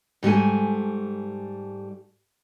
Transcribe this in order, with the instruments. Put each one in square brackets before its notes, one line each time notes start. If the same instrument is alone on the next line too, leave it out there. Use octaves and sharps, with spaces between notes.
[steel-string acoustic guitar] G#2 G3 A3 G#5